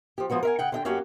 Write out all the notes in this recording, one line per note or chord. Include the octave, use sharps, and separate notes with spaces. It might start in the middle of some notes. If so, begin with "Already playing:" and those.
F3 G4
F3 G#3 B3 F#4
A#4 E5 G#5
C#3 F#5 G5
D3 D#5 G5
F#2 A#3 C#4 F#4 G4